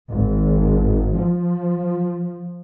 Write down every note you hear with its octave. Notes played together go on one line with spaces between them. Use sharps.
G#1
F3